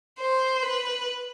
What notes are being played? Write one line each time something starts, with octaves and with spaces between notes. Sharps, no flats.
C5
B4